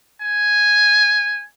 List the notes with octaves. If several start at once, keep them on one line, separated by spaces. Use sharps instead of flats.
G#5